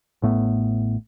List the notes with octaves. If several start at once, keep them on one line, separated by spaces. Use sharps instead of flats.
A1 A2 A3 B3